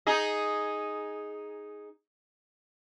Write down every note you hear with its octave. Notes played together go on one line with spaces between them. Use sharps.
D#4 G#4 D#5